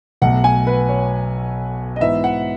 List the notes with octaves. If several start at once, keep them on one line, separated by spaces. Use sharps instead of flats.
B1 B2 A3 F#5
G#5
B4
C#5
D#5
G#2 E3 B3 D#4 E5
F#5